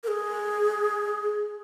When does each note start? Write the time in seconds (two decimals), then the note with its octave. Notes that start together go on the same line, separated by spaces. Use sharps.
0.04 A#4
0.08 G#4